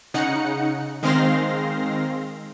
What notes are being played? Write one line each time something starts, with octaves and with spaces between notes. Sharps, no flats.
C#3 D#4 F#5 C#7
D#3 G#3 C4 F5 C6 A#6